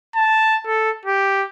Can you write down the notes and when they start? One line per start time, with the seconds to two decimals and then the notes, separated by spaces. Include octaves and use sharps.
0.15 A5
0.67 A4
1.05 G4